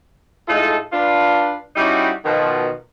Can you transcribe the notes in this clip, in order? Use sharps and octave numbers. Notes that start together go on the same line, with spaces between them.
A2 G#3 D#4 F4 A4
D4 F4 B4
G3 C#4 D#4 E4 F#4 G4
B2 D#3 F3